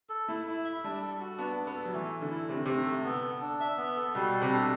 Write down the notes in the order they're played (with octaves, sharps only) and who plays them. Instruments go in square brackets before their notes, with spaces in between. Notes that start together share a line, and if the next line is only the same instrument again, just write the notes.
[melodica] A4
[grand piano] A3 [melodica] E4
[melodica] E4
E5
[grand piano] G3 [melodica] D4
[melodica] A4
F#4
[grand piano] B3 [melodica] D4
[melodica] D4
[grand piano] B3
[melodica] A4
[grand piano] F#3
[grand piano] E3 [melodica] A3
[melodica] A4
[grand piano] D3
[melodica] E4
[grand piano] C3 [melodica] A3
[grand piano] D3
[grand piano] C3 [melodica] A3
[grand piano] D3
[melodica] A4
B3
A4
D4
E5
B3
A4
[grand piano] B2 [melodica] G3
[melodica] A4
[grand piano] C3
[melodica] D4